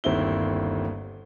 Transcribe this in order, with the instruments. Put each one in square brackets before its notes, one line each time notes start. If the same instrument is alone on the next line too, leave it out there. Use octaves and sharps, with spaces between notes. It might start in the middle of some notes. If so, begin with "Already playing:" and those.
[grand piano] G1 D#2 C4 E4 G7